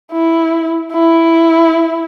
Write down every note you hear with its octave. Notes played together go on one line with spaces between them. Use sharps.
E4
E4